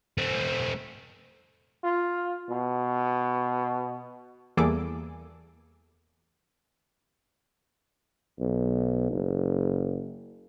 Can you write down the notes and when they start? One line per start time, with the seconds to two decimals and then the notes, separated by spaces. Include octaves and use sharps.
0.18 A3 C4
1.84 F4
2.50 B2
4.57 E2 G3 A#3 G#4 A4 D6
8.40 B1
9.11 F#1